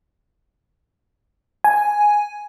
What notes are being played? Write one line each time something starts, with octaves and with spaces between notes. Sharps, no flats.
G#5